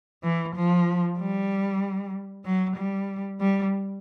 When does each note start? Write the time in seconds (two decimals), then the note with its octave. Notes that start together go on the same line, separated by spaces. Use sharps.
0.24 E3
0.56 F3
1.19 G3
2.45 F#3
2.76 G3
3.40 G3